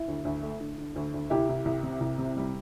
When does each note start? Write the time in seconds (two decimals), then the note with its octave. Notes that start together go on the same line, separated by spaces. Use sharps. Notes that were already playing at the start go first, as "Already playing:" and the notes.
Already playing: E4
0.08 D2
0.25 D2
0.43 A3
0.60 D3
0.78 D3
0.96 D2
1.14 D2
1.30 C2 E4 G4
1.49 C2
1.65 C2
1.83 C3
2.00 C2
2.18 C3
2.37 G3